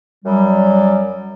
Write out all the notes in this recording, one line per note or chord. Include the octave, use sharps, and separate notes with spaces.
F#2 F#3 G3